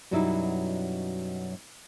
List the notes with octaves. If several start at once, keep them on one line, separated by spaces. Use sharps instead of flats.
F#2 B2 F#3 G3 D#4 E4